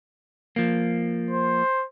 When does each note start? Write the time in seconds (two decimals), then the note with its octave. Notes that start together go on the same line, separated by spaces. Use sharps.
0.56 F3 A#3
1.30 C5